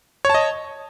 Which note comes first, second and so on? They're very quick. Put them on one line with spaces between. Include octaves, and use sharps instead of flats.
C#5 A5 D#5